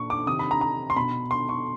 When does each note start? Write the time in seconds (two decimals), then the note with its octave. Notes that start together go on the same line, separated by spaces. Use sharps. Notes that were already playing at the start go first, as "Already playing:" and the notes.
Already playing: A#2 C#6
0.10 D6
0.27 C3 D#3 D#6
0.39 B5
0.51 A#5
0.61 A#5
0.90 C6
0.96 B2 B5
1.31 C6
1.49 C#6